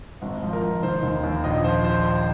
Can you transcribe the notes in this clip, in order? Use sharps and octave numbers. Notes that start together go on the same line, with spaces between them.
G#1
F3
A#4
G#1
D#3 C5
D#2
D#2
A#1 D#5
F3 C5
C5